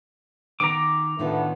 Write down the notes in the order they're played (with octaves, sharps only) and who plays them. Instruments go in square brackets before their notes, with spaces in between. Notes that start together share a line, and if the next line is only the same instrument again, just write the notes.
[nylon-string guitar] D#3 B3 D#4 [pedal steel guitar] A#5 D6
[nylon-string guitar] A2 D#3 F4 [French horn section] D3 A3 B3